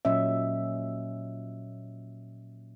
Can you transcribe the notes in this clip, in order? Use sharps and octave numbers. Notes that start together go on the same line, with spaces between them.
A#2 F#3 C#4 D#5 E5